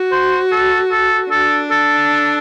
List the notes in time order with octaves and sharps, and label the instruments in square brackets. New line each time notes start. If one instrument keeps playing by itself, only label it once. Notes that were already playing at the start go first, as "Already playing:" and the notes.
Already playing: [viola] F#4
[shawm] C5
A4
A4
[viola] D4 [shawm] A4
[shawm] A4